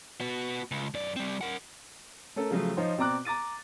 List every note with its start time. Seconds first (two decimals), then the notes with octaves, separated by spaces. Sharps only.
0.21 B3 F#4
0.71 C#2
0.94 F#2 D5
1.16 G3 C4
1.41 A#4 F#5
2.36 A3 C#4 A4 A#4
2.51 C#3 F3 F#3 A3
2.77 F3 D#4 F4 C5 C#5
2.97 B2 C4 D5 A#5 D6 F#6
3.25 A#5 D6 A6 D#7